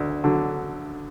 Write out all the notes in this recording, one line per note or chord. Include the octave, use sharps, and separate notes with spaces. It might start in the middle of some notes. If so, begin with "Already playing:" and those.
Already playing: D2
D3 F#3